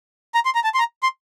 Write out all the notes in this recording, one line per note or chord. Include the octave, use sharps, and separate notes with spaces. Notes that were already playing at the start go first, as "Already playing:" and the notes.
A#5
C6
A#5
A5
C6
A#5
C6